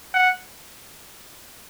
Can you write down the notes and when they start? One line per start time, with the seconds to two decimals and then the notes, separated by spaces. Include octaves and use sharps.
0.14 F#5